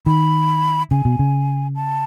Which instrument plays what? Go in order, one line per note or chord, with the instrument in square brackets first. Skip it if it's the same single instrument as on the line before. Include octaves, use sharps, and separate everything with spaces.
[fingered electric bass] D#3 [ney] B5
[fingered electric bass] C#3 [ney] G#5
[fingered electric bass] B2
C#3
[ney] A5